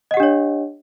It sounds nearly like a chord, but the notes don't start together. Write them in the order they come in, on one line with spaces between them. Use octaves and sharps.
D#5 F#5 G4 D4 C#5